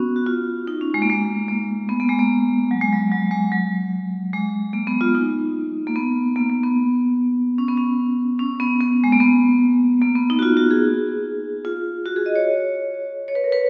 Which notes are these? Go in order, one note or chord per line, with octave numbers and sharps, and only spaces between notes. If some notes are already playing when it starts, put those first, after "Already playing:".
Already playing: B3 C#4 F#4
F#4
F4
D#4
C#4
G#3
A#3
G#3
A#3
B3
A#3
G#3
A#3
F#3
G#3
F#3
F#3
G#3
F#3
G#3
A#3
B3
F4
D#4
A#3
B3
A#3
A#3
B3
C#4
B3
C#4
C#4
B3
B3
G#3
A#3
B3
A#3
B3
D#4
F#4
F4
F#4
G#4
F4
F#4
G#4
D#5
C#5
C#5
B4
A#4
B4